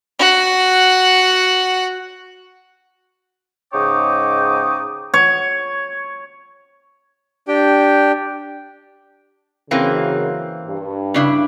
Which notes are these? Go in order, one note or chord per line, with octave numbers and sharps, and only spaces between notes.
F#4 F#5
G#2 C#3 D#4 C#5 G5 D6
C#5
D4 G4 G5
F#2 C#3 E3 A#3 C4
G2
C#3 D4 E4